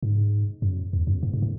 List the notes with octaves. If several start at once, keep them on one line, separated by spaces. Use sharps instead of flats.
G#2
F#2
E2
F#2
A2
G#2
A2